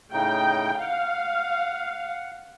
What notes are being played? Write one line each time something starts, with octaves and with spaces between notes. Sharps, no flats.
A2 C#3 D#4 G5
F5 F#5